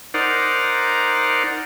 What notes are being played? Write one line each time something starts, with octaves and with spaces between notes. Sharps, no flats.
D#4 A#4 C5 D5 F#5